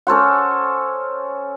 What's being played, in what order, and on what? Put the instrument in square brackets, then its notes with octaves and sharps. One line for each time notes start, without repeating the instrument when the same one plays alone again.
[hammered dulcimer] C#4 A4 C5 F#5